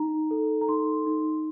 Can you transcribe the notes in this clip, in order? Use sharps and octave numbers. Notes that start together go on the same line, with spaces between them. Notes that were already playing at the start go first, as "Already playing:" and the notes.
Already playing: D#4 A#5
A4
A#5
D#4 C6
D#4